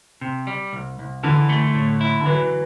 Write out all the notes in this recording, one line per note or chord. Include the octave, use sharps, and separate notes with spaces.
C3
G3
C2
C2
D3 E3
A3
A2
E4
D3
E3 F#3